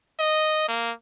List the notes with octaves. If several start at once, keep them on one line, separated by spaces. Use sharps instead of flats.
D#5
A#3